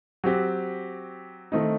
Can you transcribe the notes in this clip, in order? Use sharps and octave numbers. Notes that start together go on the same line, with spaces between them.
F#3 C4 G4
D#3 A3 C4 D#4